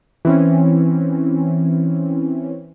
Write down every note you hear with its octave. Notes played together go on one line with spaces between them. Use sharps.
E3 C4 C#4